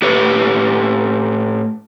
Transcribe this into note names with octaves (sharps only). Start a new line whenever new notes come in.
A2 G4 B4 C#5